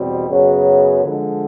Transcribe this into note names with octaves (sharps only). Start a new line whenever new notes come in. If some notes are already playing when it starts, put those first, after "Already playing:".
Already playing: E2 B2 G3 C4
F#2 C#3 F#3 B3
D3 F3 G#3